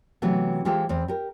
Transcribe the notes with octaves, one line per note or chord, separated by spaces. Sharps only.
C3 E3 F#3 A3 B3
E3 G#3 F4 G4 A4 C5
E2 C4
G4 A#4